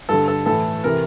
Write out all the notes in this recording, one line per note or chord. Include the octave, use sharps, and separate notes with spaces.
G2 D3 A4
A4
A2 E3 A4
C3 E3 A#4